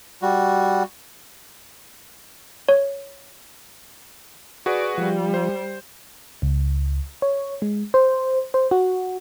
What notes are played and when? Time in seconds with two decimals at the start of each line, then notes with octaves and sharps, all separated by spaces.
0.22 G3 F#4
2.69 C#5
4.66 F#4 G#4 B4 D5
4.98 F3 G3
5.34 C5
6.42 C#2
7.22 C#5
7.62 G#3
7.94 C5
8.54 C5
8.71 F#4